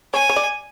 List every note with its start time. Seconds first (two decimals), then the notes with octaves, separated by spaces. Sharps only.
0.13 C#5 G#5
0.29 C#5
0.36 D5